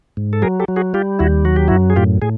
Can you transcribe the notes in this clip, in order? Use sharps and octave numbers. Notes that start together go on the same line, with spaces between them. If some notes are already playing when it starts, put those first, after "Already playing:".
G#2
A4
F#3 G#4 A#4
G4 A4
F#3
F#4 G#4
G3 F4 G4
D#2 E4 F#4
F#3 F#4
G4
F#2 E4 F#4
G#4
A2 F4 G4
A2 G#4